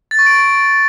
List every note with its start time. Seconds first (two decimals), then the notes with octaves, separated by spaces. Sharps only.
0.11 A6
0.19 C#6
0.26 D7